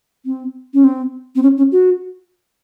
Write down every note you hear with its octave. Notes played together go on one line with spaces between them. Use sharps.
C4
C#4
C4
C4
C#4
C#4
F#4